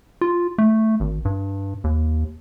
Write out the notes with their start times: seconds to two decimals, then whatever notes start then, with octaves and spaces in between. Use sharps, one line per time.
0.21 F4
0.58 A3
1.00 G#1
1.25 G2
1.84 D#2